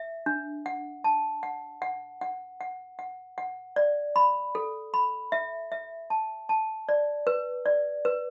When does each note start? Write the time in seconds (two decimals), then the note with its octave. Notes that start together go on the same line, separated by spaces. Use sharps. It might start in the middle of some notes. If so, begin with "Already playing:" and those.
Already playing: E5
0.26 D4
0.66 F#5
1.04 A5
1.43 F#5
1.82 F#5
2.21 F#5
2.61 F#5
2.99 F#5
3.38 F#5
3.76 D5
4.16 B5
4.55 A4
4.94 B5
5.32 E5
5.72 E5
6.10 A5
6.49 A5
6.89 D5
7.27 B4
7.66 D5
8.05 B4